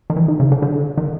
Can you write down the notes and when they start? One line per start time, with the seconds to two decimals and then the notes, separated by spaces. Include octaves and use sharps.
0.10 D#3
0.16 E3
0.28 D#3
0.40 C#3
0.52 D3
0.62 D3
0.97 D#3